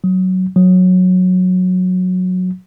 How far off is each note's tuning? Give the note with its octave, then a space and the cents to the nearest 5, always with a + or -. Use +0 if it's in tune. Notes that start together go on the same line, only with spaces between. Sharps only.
F#3 +5
F#3 -15